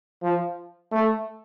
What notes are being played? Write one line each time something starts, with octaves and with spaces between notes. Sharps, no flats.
F3
A3